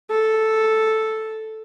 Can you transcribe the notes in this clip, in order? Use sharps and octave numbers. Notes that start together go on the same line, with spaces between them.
A4